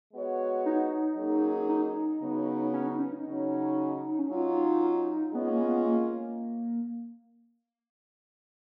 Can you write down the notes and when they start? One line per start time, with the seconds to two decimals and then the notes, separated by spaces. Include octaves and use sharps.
0.13 G#3 B3 F#4 C#5
0.66 D#4
1.17 F#3 A#3 C#4 G#4
1.69 D#4
2.21 C#3 F#3 B3
2.73 C#4
2.87 D#4
2.99 C#4
3.13 D#4
3.26 C#3 F#3 C#4
4.19 C#4
4.29 F#3 C#4 D#4 F4
5.33 G#3 B3 C#4 F4
5.49 A#3
5.60 B3
5.86 A#3